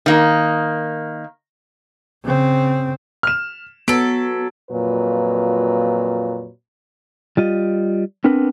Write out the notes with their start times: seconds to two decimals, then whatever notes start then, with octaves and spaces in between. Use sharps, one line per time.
0.06 D#3 A#3
2.24 C#3 C4
3.23 F6 E7
3.88 F#3 B3 A4 D7
4.71 F2 A#2 F#3 B4
7.37 G3 F4 D#5
8.24 B3 C4 D4 A#4 B4